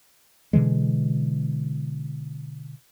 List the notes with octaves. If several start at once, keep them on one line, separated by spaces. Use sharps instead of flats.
B2 D3 E3 G#3